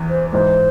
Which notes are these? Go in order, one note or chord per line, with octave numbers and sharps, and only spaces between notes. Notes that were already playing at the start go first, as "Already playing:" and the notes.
Already playing: E2 E3
C5
G#2 E3 G#3 C5